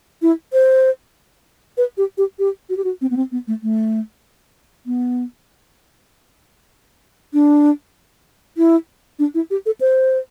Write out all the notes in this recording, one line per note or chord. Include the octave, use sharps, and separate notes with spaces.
E4
C5
B4
G4
G4
G4
F#4
G4
F#4
C4
B3
C4
B3
A3
A3
B3
D4
E4
D4
E4
G4
A4
C5